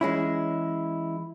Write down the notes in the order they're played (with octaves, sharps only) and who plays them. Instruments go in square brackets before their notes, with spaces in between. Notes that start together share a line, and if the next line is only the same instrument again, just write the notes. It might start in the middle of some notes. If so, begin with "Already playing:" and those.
[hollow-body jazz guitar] E3 G#3 C#4 E4